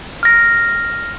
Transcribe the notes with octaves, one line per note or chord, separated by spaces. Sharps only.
F6 A#6